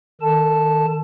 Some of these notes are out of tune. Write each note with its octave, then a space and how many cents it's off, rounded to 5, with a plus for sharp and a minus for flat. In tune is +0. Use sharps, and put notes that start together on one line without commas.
D#3 +0 A4 +25 A5 -5